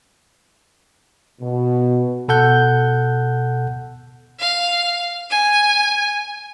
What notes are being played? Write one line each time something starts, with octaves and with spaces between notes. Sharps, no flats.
B2
B2 A4 F#5 G6
F5
G#5